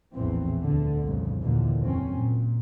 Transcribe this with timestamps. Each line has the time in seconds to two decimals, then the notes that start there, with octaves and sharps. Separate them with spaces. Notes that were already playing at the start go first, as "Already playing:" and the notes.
0.13 A#1 E2 A2 E3 C4
0.63 D2 D3
1.04 C2 F2 A#2 C#3
1.41 D#2 A#2 D3 E3
1.82 F#1 F2 C4 C#4
2.14 A#2